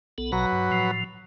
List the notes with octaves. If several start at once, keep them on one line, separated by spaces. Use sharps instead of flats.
B1 B3 A4
A#1 B2 F#3 B4 A#5
G2
A2 F3